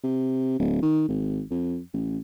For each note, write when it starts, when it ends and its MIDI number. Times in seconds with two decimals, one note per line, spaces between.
0.04 0.55 48
0.59 0.82 26
0.82 1.05 51
1.08 1.42 32
1.51 1.80 41
1.93 2.18 33